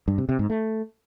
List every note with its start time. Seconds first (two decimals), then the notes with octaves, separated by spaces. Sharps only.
0.08 G2
0.18 C3
0.29 C3
0.39 G#2
0.50 A3